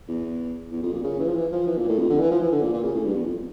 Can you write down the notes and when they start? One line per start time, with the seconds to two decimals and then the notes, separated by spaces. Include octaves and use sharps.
0.08 E2
0.72 E2
0.83 F2
0.93 A#2
1.04 C#3
1.20 E3
1.28 F3
1.35 E3
1.52 F3
1.67 E3
1.78 A#2
1.89 A2
1.99 F2
2.10 D3
2.20 E3
2.31 F3
2.41 E3
2.52 D3
2.62 A#2
2.73 A#2
2.84 C#3
2.94 A2
3.05 G2
3.15 E2
3.26 F2